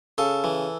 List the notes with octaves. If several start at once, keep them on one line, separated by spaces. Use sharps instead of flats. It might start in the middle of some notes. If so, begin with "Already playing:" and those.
C#3 A4
E3